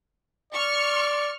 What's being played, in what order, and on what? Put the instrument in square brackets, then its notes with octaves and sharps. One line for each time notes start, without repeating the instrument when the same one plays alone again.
[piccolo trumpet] D5 [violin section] C#6 F6